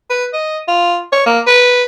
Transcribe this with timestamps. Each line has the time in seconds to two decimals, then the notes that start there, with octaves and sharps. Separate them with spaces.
0.10 B4
0.34 D#5
0.68 F4
1.13 C#5
1.26 A#3
1.47 B4